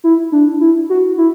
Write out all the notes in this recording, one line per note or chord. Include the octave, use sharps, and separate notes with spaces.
E4
D4
E4
F#4
E4